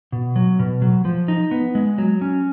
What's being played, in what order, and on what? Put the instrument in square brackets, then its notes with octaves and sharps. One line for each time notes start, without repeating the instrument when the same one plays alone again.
[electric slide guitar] B2
F#3
B2
F#3
F3
D#4
B3
G#3
F#3
C#4